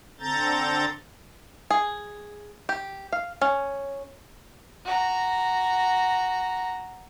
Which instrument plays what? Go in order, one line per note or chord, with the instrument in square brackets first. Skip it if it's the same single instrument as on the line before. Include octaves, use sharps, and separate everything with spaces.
[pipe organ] D3 C4 A4 A#5 G6 A6
[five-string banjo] G#4
G4
F5
C#4
[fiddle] F#4 A#5